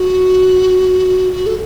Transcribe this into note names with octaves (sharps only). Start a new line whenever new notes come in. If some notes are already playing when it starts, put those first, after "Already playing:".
Already playing: F#4
F#4
A4